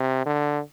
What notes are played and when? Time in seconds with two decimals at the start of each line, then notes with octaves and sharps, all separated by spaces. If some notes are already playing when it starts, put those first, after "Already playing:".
Already playing: C3
0.26 D3